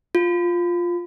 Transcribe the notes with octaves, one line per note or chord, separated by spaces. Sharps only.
F4